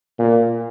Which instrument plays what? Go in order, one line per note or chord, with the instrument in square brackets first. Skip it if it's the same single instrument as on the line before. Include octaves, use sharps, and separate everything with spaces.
[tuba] A#2